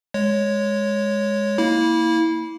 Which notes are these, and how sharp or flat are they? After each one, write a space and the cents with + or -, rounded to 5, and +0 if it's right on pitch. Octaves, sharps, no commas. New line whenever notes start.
G#3 -5 C#5 +0
A#3 +0 E4 -20